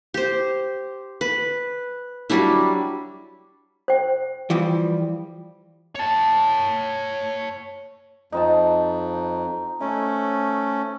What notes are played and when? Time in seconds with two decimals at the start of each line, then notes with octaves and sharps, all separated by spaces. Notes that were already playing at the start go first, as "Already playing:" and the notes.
0.14 G4 C5
1.21 B4
2.30 F#3 G3 D4 E4
3.88 C5 G5
4.50 E3 F3 G3
5.95 C#5 A5
8.32 F2 D#4 C5 A5
9.81 A3 C#4 E4